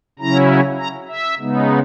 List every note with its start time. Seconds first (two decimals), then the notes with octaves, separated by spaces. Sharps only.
0.19 C#3 F#3 C#4 E4 A#5
0.79 A#5
1.08 E5
1.38 C#3 G#3 B3 D#4